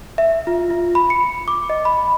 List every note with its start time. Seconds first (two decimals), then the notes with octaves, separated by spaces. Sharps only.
0.18 E5
0.47 F4
0.70 F4
0.95 B5
1.10 C#7
1.48 D6
1.70 D#5
1.85 B5